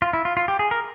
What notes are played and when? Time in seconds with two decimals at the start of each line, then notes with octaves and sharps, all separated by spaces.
0.02 F4
0.13 E4
0.25 F4
0.37 F4
0.48 G4
0.59 G#4
0.71 A#4